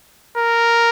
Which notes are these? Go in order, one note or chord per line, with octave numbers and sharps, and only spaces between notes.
A#4